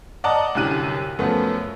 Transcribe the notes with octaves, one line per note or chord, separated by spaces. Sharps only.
D5 D#5 F#5 A5 A#5
C2 F#2 D3 G4 F#6 D#7
F#2 F3 A3 B3